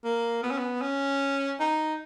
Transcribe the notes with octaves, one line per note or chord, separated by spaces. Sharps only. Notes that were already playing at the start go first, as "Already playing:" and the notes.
A#3
B3
C#4
B3
C#4
D#4